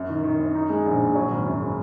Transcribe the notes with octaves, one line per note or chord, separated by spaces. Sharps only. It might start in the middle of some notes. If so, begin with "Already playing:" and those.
Already playing: F#2
D#3
D#3
F#2
D#4
G#3
A#1
A#1
F#3
G#1
F#2
C#3